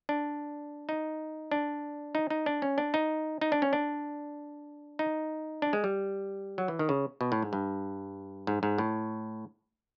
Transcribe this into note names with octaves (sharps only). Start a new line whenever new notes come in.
D4
D#4
D4
D#4
D#4
D4
C#4
D4
D#4
D#4
D4
C#4
D4
D#4
D4
G#3
G3
F#3
E3
D#3
C#3
B2
A2
G#2
G2
G#2
G#2
A2